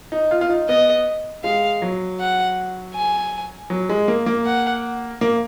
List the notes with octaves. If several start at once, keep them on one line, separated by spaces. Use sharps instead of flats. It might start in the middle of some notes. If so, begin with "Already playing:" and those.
D#4
F4
F4
D#4
B3 D#5
G#3 F5
F#3
F#5
G#5
F#3
G#3
A#3
A#3
F#5
A#3